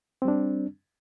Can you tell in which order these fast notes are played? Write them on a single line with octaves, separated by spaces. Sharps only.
C4 G3 D4